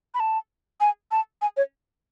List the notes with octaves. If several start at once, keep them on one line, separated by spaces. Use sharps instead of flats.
B5
A5
G#5
A5
G#5
C#5